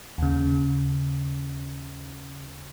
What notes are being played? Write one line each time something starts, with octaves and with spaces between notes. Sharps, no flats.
D#2 C#3